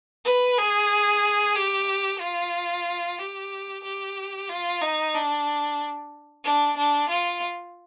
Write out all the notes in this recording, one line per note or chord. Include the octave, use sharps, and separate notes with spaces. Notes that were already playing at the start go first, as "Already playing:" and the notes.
B4
G#4
G4
F4
G4
G4
F4
D#4
D4
D4
D4
F4